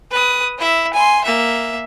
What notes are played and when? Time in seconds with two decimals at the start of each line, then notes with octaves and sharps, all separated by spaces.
0.11 B4 D#6
0.58 E4 E5
0.94 G#5 C6
1.24 A#3 E5